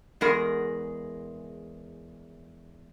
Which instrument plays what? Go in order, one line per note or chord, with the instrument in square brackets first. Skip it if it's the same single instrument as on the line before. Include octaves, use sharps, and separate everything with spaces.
[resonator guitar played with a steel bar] E2 G#3 G#4 A#4